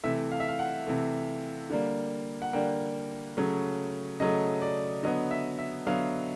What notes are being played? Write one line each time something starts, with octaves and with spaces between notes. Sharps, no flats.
C3 E3 A3 E5
F5
E5
F5
F#5
C3 E3 A3
D3 G3 A#3
F#5
D3 G3 A#3 G5
C#3 F#3 A3
C#3 F#3 A3 D#5
D5
D3 F#3 B3 D#5
E5
E5
D3 F#3 B3 F5